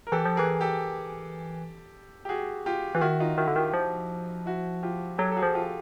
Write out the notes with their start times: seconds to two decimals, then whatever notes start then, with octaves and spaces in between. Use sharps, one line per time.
0.07 A#4
0.12 E3 G4 A4
0.25 F3
0.36 E3 G#4 A#4
0.61 G4 A4
2.25 G4
2.29 F#4 G#4
2.66 F4 G4
2.95 E3 F4
3.01 D#3 E4 F#4
3.20 D#4 F4
3.37 D#3 E4 F#4
3.48 D3
3.56 D#3 F4 G4
3.74 F3
4.46 E4 F#4
4.83 F4 G4
5.18 F#3 G4 A4
5.31 A4
5.36 F#4 G#4
5.43 F3
5.54 F4 G4